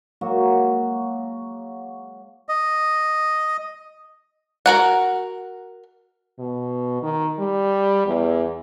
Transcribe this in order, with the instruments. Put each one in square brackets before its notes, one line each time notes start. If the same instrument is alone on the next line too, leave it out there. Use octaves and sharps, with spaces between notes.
[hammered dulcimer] F#3 G#3 A#3 F#4
[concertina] D#5
[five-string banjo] F#4 A#4 F#5
[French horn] B2
D#3
G3
E2